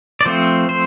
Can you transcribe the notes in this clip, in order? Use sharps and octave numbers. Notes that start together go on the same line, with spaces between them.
D5
F3 A3 C4 C5
C5